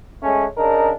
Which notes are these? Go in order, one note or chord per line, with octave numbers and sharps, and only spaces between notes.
G#3 A3 C#4
C#3 D4 D#4 A#4